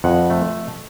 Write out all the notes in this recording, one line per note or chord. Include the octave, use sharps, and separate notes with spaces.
F2 F#5
A3